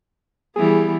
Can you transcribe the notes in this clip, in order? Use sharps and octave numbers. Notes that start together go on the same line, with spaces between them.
E3 G3 B3 G#4